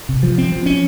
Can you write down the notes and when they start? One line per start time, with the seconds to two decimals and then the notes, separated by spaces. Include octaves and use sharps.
0.09 C3
0.23 F3
0.38 C4
0.52 F3
0.66 C#4